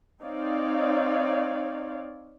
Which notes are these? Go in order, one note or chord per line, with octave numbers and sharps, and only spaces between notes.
C4 D#4 C#5 D5 F5